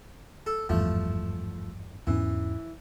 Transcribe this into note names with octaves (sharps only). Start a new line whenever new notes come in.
A4
G#1 E2 G2 F3 A3
E2 G#2 E3 C#4